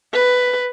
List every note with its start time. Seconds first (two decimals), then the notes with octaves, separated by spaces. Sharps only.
0.14 B4